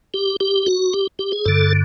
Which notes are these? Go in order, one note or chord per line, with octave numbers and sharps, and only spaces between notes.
G4
G4
F#4
G4
G4
G#4
G2 D3 A4